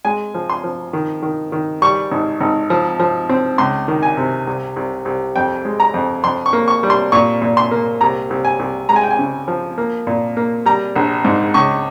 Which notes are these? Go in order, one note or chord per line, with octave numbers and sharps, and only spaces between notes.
G#3 G#5
F3
C6
F3
D#3
D#3
D#3
G3 C#6
G#1
G#1
F3
F3
C4
C#2 C6
D#3
G#5
C3
C2
C2
C2
F2 G5
G#3
A#5
F2
F2 C6
C#6
A#3
C#6
G3
C6
A#2 C#6
A#2
C6
A#3
C2 A#5
C2
G#5
C2
G#3 A#5
G#5
G5
G#5
C#3
F3
A#3
A#2
A#3
G3 A#5
A#1
G#2
C#2 C#6